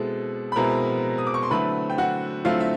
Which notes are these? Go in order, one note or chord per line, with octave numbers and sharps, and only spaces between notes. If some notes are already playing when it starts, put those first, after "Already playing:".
Already playing: B2 G#3 C4 E4 A4
B5
B2 G#3 C4 E4 A#4 A#5
D#6
D6
C#6
C6
D3 F#3 A3 C4 E4 B4 B5
G5
F#4 F#5
D3 F#3 A3 C4 E4 F4 F5
E5